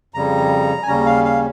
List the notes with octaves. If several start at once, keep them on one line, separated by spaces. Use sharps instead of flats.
F2 C#3 G3 A#5
G#5
D#2 C#3 G3 C#4 A#5
F5
F5